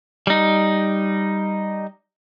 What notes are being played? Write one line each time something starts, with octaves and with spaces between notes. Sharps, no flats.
G3 D#4